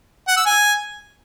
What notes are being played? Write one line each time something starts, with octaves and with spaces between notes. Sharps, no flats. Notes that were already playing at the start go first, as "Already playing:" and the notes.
F#5
E6
G#5